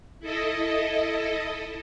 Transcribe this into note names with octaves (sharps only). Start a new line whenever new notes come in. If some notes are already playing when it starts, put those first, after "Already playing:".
E4 A4 D#5